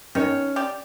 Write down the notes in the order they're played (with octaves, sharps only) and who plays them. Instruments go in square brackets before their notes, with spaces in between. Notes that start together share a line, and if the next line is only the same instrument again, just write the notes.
[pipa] D#3 [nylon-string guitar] C#4 C#5
[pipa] G4 D5